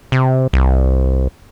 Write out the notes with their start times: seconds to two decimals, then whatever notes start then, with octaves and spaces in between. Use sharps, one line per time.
0.12 C3
0.53 C2